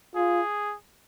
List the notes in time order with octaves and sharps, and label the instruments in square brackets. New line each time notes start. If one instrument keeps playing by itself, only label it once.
[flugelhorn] F4 [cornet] G#4